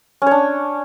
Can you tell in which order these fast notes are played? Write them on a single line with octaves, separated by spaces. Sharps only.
C#4 C#5 D4